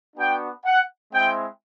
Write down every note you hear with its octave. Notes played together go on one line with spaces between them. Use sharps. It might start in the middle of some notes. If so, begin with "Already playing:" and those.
B3 D4 F#4 G5
F#5
G#3 C4 E4 G5